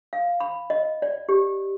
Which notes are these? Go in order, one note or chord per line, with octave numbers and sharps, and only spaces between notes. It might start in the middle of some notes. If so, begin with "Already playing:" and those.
F5
B5
D#5
D5
G4